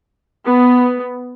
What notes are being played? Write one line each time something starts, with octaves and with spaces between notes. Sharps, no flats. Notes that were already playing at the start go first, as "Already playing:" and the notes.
B3